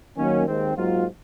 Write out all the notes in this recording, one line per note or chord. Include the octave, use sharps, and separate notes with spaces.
D#3 F#3 A#3 C#4
D#2 D#3 G#3 C4
G#2 F#3 A#3 F4